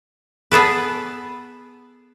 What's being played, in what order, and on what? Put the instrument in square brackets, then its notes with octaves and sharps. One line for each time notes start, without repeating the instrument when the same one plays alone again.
[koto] B3 G#4 A4 B4